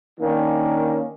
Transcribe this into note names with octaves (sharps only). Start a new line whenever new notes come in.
D#3 A#3 C#4 D4